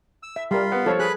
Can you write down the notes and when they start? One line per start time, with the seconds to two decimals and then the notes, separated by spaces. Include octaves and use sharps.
0.23 E6
0.36 E5
0.51 G3 F4 A#4 B5 C6
0.72 B3
0.86 F3 A4 C#5
0.99 G#4 B4 B5 F#6